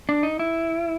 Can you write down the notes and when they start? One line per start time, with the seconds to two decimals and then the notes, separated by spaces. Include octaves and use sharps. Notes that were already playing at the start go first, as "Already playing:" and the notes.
0.09 D4
0.23 D#4
0.39 E4